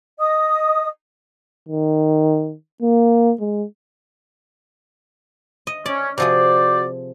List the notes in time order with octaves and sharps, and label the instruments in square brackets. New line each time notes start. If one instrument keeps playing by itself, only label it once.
[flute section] D#5 D#6
[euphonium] D#3
A#3
G#3
[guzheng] D#5
[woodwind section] C#4 [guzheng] D5
[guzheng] C3 F3 G#4 [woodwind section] F#4 C5 D5